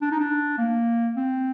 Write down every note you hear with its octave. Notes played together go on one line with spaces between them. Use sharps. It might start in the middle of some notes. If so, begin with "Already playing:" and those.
D4
D#4
D4
A#3
C4